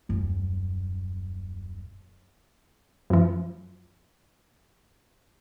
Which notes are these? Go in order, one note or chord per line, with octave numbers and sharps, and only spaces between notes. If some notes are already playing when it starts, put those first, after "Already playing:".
D#1 F#2
F#2 F3